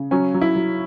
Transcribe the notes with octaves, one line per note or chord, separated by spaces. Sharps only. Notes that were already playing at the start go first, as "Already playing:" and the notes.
Already playing: C#3
F#3 C#4
F#3
E4
F#3